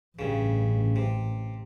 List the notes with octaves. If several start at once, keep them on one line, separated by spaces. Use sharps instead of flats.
A1 G2 C#3
C3